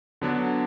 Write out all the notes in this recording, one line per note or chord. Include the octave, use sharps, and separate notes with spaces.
D3 F#3 B3 D4